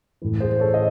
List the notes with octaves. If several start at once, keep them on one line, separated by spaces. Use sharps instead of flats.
A2 E3
G#4 C5
A4 C#5
D#5